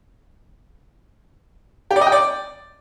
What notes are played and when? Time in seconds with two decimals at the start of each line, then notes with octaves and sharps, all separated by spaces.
1.91 G4
1.96 D5
2.01 D#5
2.07 G5
2.12 D5